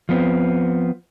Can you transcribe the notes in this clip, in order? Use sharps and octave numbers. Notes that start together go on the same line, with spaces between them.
F3 B3 C4